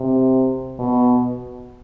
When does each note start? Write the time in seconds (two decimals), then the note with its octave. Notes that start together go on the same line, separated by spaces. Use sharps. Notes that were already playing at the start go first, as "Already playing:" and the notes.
Already playing: C3
0.79 B2